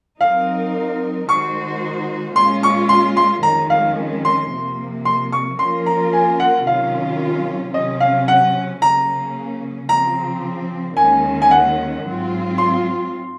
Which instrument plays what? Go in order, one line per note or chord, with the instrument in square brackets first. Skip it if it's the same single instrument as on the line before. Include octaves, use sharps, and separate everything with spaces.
[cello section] F#3 C4 D#4 A#4 [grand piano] F5
[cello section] D#3 G#3 D#4 F#4 C5 [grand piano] C#6
[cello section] A#2 G#3 C#4 F4 [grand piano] C6
[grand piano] C#6
C6
C6
[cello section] F2 D#3 G#3 C#4 [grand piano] A#5
[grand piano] F5
C6
[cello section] C3 F3 A#3
[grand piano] C6
C#6
[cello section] F3 A#3 C#4 F4 A#4 [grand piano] C6
[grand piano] A#5
G#5
F#5
[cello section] C3 D#3 F#3 C#4 F4 [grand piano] F5
[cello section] C3 F#3 C#4 [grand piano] D#5
[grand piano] F5
F#5
[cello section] C#3 F#3 A#3 C#4 [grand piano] A#5
[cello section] C#3 F3 C4 [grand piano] A#5
[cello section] D#2 D#3 G#3 C#4 [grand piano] G#5
[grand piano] G#5
F#5
[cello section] G#2 F#3 C4 F4
[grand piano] C6